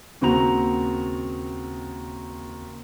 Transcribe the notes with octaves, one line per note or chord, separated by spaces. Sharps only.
D#2 C#3 C4 F#4 A#5 F7